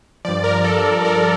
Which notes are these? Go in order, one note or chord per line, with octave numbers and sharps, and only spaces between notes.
G2 F3 D5
A#4
A#4
A4
A#4